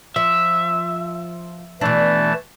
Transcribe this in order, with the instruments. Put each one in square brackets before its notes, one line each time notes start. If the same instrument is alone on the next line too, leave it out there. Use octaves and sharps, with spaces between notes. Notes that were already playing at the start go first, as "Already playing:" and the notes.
[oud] F3 [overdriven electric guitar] E5
[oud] B2 D4 [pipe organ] E3 A3 A5